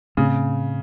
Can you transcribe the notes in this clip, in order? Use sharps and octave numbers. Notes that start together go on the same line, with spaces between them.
A2 C#3 A3 C4